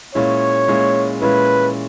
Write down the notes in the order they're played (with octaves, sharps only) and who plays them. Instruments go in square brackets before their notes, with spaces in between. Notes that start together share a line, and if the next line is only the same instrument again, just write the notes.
[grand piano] A#2 G#3 C#4 E4 [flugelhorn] C#5
[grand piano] A#2 G#3 C#4 E4
[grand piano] A#2 G#3 C#4 E4 [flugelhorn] B4